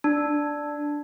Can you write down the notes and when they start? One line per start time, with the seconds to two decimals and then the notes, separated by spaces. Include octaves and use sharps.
0.04 D4